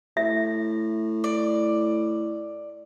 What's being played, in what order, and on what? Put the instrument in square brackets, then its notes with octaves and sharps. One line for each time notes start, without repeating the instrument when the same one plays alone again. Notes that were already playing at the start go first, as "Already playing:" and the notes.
[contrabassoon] A2 [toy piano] E5
[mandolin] D5